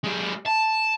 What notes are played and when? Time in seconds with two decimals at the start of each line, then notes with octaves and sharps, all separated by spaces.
0.04 G#3 G4
0.46 A5